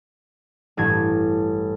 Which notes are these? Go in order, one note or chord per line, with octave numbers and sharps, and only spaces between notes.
A1 G2 G#6